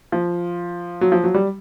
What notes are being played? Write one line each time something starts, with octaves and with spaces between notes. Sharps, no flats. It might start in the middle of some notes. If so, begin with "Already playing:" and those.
F3
F#3
F3
F#3
G3